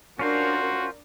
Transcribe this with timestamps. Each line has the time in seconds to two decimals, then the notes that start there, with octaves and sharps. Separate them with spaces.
0.19 C#4 D4 F4 F#4 A#4 C5